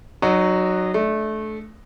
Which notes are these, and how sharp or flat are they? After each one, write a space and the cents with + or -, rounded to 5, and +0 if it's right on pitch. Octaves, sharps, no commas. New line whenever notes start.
F#3 +0 D#4 -30 F#4 +0
A3 -20 D4 +0